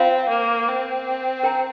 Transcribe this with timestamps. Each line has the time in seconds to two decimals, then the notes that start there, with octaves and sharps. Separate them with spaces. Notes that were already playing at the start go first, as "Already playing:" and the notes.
Already playing: C4 F4 C5 F5 C6
0.30 A#3
0.68 C4
1.43 A#4 G5 A#5